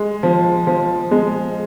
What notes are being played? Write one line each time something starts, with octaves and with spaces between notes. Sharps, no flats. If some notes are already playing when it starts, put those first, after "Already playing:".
Already playing: G#3
F3
F3
G#3